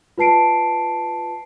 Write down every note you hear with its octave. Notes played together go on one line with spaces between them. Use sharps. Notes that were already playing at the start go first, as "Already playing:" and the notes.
F4 B4 A5 C7 D7